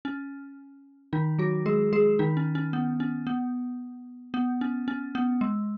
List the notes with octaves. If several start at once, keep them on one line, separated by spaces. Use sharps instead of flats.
C#4
D#3 D#4
F#3 F#4
G#3 G#4
G#3 G#4
D#3 D#4
C#4
C#4
B3
C#4
B3
B3
C#4
C#4
B3
G#3